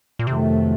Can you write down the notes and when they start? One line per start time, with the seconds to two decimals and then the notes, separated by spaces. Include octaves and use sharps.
0.19 A#2
0.27 F2 C3 D#3 F#3 A3